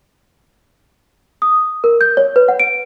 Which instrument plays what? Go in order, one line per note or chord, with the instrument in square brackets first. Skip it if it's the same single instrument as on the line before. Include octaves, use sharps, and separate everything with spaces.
[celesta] D#6
A#4
G6
C#5
B4
F#5
D7